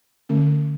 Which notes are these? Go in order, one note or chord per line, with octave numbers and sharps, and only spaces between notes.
D3 A3 C#4